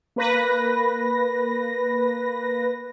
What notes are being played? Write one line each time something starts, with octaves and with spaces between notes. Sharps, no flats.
A#3 B4 A#6